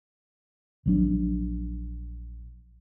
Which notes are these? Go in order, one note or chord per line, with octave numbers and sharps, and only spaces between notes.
A#1 F#3 D4